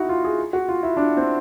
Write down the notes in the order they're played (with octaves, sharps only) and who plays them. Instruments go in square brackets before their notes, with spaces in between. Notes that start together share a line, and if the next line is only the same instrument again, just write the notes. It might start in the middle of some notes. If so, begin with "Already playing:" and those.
Already playing: [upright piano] D#4 E4 F#4
F4
G#4
F#4
F4
E4
D4
C4